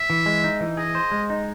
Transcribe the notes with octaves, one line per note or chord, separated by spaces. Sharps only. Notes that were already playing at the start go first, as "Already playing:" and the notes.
Already playing: E5
E3
G#3
D#4
E3
G#4 D#5
C5
G#3
D#4